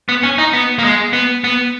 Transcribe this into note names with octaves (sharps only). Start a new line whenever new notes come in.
B3
C#4
D#4
B3
A#3
G#3
B3
B3